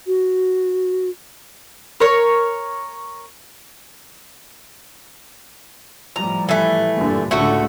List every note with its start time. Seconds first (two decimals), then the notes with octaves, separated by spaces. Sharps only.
0.07 F#4
2.00 A#4 C#5
6.16 A2 F3 G3 A#5
6.49 E3 A3
6.95 G2 A#2 D3
7.31 C#2 A2 D3 A3 F#4 A4